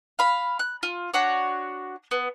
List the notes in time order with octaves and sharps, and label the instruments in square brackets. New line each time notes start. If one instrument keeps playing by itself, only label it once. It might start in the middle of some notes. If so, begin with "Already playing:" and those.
[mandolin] F5 B5
F#6
F4
D4 F#4 C#5
B3